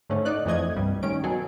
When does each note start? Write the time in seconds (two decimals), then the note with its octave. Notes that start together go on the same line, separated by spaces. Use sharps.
0.10 G#2 D3 A3 C#4
0.25 D#4 D5 F#6
0.45 F2 E3 F3 A3 D#5 G#6
0.76 C2 G2 G3
1.03 A1 D#3 C#4 D7
1.23 B2 F#3 G#4 A4